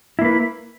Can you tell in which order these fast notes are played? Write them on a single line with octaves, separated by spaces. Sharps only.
E4 A#3 B4